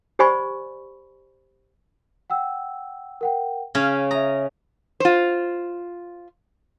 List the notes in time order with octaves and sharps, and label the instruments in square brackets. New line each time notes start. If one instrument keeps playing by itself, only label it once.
[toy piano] G4 C5 D5 G#5 B5 C#6
[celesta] F#5 G5 E6
A#4 F#5 G5
[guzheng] C#3 C#4 F5 [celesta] G#6
[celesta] E5 D#6 [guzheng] A#5
[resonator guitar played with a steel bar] F4 C5